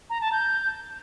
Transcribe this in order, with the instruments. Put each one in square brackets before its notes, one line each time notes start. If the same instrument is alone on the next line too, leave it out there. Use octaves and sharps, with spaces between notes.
[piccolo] A#5
A5
G6